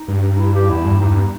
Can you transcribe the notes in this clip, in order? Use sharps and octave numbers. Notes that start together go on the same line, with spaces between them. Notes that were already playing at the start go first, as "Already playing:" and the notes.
Already playing: D#4
G2
E4
G4
E2 E4
G2
G2 D#4
G2 B3